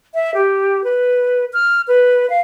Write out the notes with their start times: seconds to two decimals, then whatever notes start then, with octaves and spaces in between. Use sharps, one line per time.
0.14 E5
0.34 G4
0.84 B4
1.53 F6
1.88 B4
2.30 F5